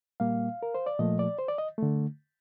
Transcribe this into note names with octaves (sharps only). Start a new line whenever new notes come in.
A#2 G3 A#3 F5
A#4
C5
D5
A#2 F3 A3 D#5
D5
C5
D5
D#5
D3 A3